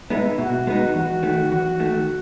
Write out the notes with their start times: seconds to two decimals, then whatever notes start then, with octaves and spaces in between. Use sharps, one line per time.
0.10 G#3 B3 D#4 E4
0.38 B2 F#4
0.67 G#3 B3 D#4
0.95 E2 F#4
1.23 D#3 A3
1.51 E2 F#4
1.79 D#3 A3